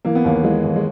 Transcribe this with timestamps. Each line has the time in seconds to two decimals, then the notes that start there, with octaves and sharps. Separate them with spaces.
0.05 E3 A#3
0.15 B3
0.24 D#2 A#3
0.44 E3 G#3
0.64 D#2
0.76 G#3